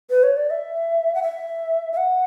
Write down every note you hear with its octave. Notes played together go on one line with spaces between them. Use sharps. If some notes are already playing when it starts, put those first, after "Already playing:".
B4
C#5
D5
E5
F#5
E5
E5
F#5